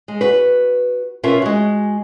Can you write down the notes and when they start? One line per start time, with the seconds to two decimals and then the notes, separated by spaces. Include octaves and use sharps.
0.08 G#3
0.21 F#4 B4
1.23 B2 C#4 F4 A#4 E5
1.42 G#3 F#4